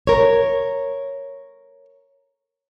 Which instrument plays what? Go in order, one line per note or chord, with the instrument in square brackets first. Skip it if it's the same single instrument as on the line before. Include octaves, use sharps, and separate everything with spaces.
[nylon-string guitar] A#4 C#5